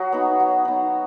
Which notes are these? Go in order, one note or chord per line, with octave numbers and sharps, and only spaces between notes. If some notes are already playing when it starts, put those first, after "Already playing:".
Already playing: F#3 F#4 G#4
B3 D#4
F#3
B3 D#4